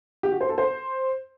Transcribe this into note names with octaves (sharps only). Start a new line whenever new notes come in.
G4
F#4
C5
A4
C5